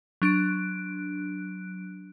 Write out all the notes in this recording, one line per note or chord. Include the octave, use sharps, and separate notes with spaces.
F#3 D4 F#6 D7